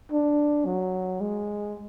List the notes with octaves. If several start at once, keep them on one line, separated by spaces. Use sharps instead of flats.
D4
F#3
G#3